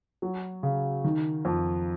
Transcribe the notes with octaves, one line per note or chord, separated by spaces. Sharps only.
F#3
C#3
D#3
F2